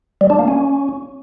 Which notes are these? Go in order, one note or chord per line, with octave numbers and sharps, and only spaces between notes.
G3
D4
A#3
C#4